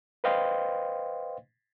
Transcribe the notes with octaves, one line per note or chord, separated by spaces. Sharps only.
B4 C5 D#5 F5 G5 C6